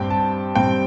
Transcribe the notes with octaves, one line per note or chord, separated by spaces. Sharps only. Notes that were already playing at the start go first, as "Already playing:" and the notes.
Already playing: G2 G3 C4 G5
A5
G2 G3 C4 G5